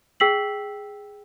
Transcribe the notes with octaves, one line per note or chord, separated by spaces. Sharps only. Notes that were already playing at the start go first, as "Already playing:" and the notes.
G#4 G5 E6 B6 C7 F#7